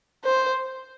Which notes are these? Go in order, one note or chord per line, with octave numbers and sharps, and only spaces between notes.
C5